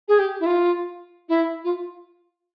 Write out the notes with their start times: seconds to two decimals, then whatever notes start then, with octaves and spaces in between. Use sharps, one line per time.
0.08 G#4
0.19 G4
0.40 E4
0.46 F4
1.29 E4
1.64 F4